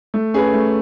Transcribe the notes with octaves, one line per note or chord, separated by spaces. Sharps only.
A3
C#4 G#4 B4
A3